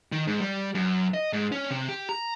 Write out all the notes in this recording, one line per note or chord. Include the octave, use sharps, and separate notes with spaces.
D#3
G#2
G3
F#2
D#5
G#2
C#4
C3
G4
A#5